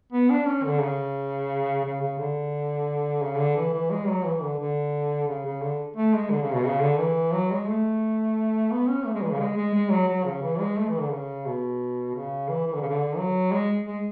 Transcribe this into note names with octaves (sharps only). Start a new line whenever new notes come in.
B3
D4
C#4
D3
C#3
C#3
C#3
D3
C#3
D3
E3
E3
G#3
F#3
E3
D3
D3
C#3
C#3
D3
A3
G#3
D3
C#3
B2
C#3
D3
E3
F#3
G#3
A3
B3
C#4
A3
G#3
E3
C#3
G#3
G#3
G#3
F#3
F#3
C#3
E3
G#3
A3
E3
D3
C#3
B2
C#3
E3
E3
D3
C#3
D3
F#3
G#3
G#3